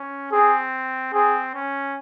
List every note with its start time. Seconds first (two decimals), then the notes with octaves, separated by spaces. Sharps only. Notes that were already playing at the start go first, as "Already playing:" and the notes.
Already playing: C#4
0.32 C4 G#4
1.13 C4 G#4
1.54 C#4